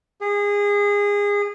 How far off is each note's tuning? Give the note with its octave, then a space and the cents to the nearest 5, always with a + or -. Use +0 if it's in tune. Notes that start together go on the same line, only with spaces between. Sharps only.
G#4 -25